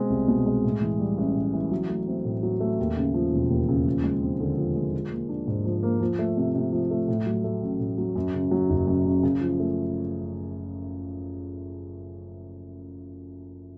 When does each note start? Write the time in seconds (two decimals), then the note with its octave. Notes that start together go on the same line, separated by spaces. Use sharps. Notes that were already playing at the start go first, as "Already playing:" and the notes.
Already playing: B2 G#3 C4
0.10 C2
0.28 B2
0.46 G#3
0.64 A2
0.82 E3
0.99 G3
1.18 A1
1.35 A2
1.54 E3
1.71 F#3
1.89 A3
2.07 C4
2.25 A2
2.43 F#3
2.61 A3
2.79 D#2
2.97 C#3
3.14 F3
3.32 E1
3.50 D#2
3.69 C#3
3.86 F3
4.04 G#3
4.22 C4
4.40 D3
4.58 F3
4.76 G#3
4.93 F3
5.11 A#3
5.29 D4
5.47 G#2
5.65 F3
5.83 A#3
6.00 F3
6.19 A3
6.37 C3
6.55 C3
6.73 F3
6.91 A3
7.08 A2
7.26 F#3
7.44 A3
7.62 A1
7.80 A2
7.98 F#3
8.15 F#2
8.34 C#3
8.51 F#3
8.70 F#1
8.87 F#2
9.05 C#3
9.23 C#3
9.41 F3
9.60 A3